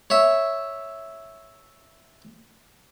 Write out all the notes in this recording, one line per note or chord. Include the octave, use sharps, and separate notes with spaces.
C#5 E5